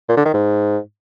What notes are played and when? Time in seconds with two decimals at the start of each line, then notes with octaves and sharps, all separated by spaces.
0.09 A#2
0.17 D3
0.25 D#3
0.34 G#2